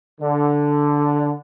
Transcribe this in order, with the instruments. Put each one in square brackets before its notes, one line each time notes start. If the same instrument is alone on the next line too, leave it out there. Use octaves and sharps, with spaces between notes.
[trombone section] D3